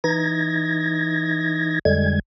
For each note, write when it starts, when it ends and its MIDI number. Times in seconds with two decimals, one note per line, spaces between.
0.04 1.79 52
0.04 1.79 63
0.04 1.79 92
0.04 1.79 94
1.85 2.19 41
1.85 2.19 50
1.85 2.19 55
1.85 2.19 56
1.85 2.19 92